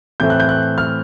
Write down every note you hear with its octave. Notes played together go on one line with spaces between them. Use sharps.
A2 E3 A3 C4 G6
F#6
G6
F#6
F6